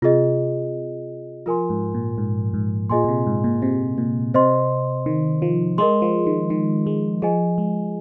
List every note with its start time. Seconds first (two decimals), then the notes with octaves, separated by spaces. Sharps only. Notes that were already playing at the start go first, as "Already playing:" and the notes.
0.02 C3 F4 G#4 D#5
1.46 F3 F4 A#4 G#5 C6
1.70 G#2
1.94 A#2
2.18 G#2
2.54 G#2
2.90 A#2 F4 G#4 D#5 G#5 C6
3.04 A#2
3.08 C3
3.27 G#2
3.44 A#2
3.62 C3
3.98 A#2
4.34 C3 C5 D#5 C6
5.06 D#3
5.42 F3
5.78 G#3 A#4 D#5 C6
6.02 F3
6.26 D#3
6.50 D#3
6.87 G#3
7.22 F3 G#4 D#5 G#5
7.58 G#3